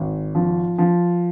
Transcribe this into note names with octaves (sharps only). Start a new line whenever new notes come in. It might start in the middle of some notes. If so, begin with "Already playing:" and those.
Already playing: G#1
F3
F3